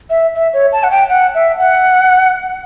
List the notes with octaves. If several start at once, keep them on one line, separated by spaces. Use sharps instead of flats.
E5
E5
C#5
A5
F#5
G5
F#5
E5
F#5